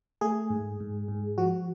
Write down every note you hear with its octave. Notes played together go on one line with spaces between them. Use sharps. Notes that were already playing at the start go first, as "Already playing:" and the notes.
A3 G#4
G#2
G#2
G#2
F3 F#4